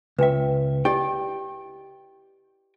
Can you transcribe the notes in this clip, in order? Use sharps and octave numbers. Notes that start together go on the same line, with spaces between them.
C#2 B4 E5 G5
E4 G4 D5 D#5 G5